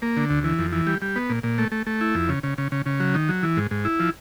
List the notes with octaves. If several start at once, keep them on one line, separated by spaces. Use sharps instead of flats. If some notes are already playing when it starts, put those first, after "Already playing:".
A#3
D3
D2
E3
F2
E3
G3
G3
B3
A#2
A#2
A3
A3
A3
E4
F2
C#3
C#3
C#3
C#3
C#3
F#3
D#3
F#3
E3
G#2
G#2
E4
F3